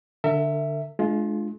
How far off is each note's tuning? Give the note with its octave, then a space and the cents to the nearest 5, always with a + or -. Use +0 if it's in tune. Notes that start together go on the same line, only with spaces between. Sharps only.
D3 +0 A#4 -45 E5 +0
G#3 +40 D4 +15 F4 -5